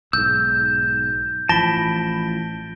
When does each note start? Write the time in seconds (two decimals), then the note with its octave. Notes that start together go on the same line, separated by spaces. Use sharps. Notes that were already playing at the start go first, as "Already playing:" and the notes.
0.13 B1 G#2 E6 G6
1.49 A1 E3 F3 A5 B5 A#6 D7 G7